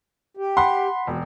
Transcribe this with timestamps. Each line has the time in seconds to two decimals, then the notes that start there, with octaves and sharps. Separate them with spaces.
0.37 G4
0.57 F#5 B5 C6
1.07 E1 F2 F#4